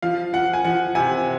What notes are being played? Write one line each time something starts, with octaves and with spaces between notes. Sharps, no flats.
F3 F5
F3 F#5
G#5
F3 F#5
C3 G#5